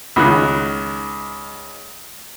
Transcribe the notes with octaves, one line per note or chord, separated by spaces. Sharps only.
C#2 D#3 F#6